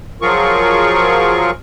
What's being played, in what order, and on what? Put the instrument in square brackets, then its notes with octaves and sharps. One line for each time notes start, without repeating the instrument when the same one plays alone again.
[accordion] F3 F#3 F4 G#4 A#4 C#6